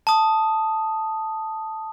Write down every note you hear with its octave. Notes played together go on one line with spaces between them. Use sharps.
A5 D#6